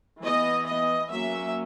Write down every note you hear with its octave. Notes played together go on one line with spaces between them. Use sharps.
E3 B3 D#5
D#5
F#3 A#3 C#4 E5